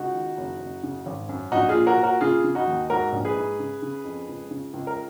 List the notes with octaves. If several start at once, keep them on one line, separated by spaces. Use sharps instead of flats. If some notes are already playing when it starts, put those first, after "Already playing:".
Already playing: C#2 D#4 F#4
D#3
F#1
F#1
C#3
G#1
F#2
A#1 D#4 F#4
F4 G#4
A#2
F#4 A#4
A#2
F#4 A#4
C#3 F4 G#4
C#3
D#4 F#4
D#2
G#2 F#4 A#4
A#1
G#4 B4
G#2
C#3
C#3
F2
C#2
C#3
C#2
A#4